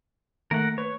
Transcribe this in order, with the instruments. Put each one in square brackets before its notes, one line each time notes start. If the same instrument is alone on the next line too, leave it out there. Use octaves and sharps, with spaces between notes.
[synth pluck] D#3 A3 A#3 [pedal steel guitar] A#4 F#5
[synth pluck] B4 [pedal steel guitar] C#5